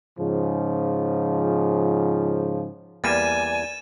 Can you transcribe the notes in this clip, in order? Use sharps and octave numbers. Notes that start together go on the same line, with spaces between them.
G#2 C#3 F3
E2 G3 A#3 D5 G#5 A6 D#7 E7